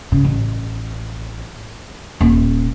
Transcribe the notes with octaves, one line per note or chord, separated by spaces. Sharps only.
C#3
A1
D#1